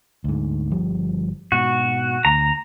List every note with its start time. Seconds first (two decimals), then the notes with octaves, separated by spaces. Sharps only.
0.24 D2 G#2
0.71 G1 F3 G3
1.52 G#2 B2 F#4
2.25 D2 A#5